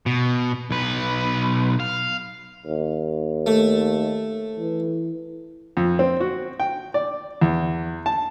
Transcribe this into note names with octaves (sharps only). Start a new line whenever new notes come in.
B2
B1 B4
F5
D#2
A3
E3
F2
C4
F#4
G5
D5
E2
A5